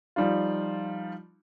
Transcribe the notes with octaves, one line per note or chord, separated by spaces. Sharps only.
F3 G3 D#4 F4